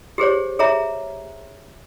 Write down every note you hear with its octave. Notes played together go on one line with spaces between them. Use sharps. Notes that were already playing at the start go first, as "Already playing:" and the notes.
G4 G#4 C5 C#5
G#4 C#5 E5 A#5